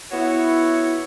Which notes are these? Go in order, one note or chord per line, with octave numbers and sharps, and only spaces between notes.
B3 E4 F#4 C#5